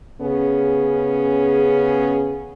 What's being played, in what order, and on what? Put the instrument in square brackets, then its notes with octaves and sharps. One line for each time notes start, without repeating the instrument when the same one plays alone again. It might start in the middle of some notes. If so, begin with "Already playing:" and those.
[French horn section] C#3 B3 C#4 G#4